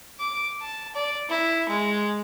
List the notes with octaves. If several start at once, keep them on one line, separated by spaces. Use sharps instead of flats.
D6
A5
D5
E4
G#3